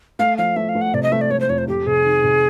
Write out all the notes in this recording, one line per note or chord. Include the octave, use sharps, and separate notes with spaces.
A3 F5
F3 F5
A3 E5
F5
A3
F#5
C3 D5
D#5
A3 E5
D5
A3 C#5
C5
F2 C#5
C5
F2 G4
C3 G#4
D#3
C3